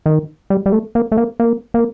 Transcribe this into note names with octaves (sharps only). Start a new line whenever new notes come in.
D#3
G3
G3
A3
A#3
A3
A#3
A#3
A#3